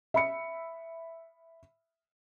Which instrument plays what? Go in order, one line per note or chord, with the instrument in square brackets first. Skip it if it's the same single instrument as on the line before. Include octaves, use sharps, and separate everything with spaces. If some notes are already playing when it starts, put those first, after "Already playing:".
[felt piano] E5 B5 C#7